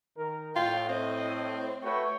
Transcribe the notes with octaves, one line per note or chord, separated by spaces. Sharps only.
D#3 A#4
A2 F4 G5
C4 D#5
A3 F#4 B4 C#5 G5